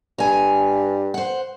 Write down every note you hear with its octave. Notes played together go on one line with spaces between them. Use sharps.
G2 G#5 A#5
C5 F#5